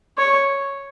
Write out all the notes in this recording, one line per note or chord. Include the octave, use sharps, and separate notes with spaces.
C#5